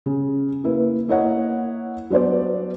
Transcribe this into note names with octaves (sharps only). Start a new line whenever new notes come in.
C#3
A#3 E4 B4
A#3 E4 A#4 C#5 D#5 F#5
F#3 B3 D4 C5 D5